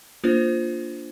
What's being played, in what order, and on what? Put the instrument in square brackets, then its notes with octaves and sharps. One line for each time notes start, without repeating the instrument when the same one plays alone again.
[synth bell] A#3 D4 F4 C5